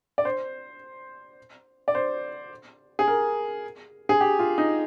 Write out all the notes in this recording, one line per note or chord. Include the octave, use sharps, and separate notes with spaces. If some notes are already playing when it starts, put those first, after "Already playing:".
D5
C5
D5
C5
G#4
A#4
G#4
G4
F4
D#4